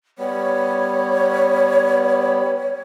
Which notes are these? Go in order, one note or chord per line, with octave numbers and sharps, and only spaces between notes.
G3 B3 C#5